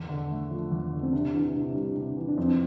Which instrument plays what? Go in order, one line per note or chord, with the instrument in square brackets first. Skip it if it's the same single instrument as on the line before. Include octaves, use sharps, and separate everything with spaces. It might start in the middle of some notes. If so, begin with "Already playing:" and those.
Already playing: [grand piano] E2
D3
A3
F3
E2
D3
[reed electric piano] C4
[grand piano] C3 [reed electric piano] D4
[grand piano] E3
C3
G3
C3
E3
[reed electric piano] D4
[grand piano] F2 [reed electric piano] C4